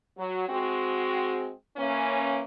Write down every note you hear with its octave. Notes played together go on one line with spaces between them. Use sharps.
F#3
G#3 C4 F#4
E3 A#3 C#4